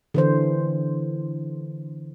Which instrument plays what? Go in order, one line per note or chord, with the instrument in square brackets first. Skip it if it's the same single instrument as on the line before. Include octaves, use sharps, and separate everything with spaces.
[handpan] D3 E3 C5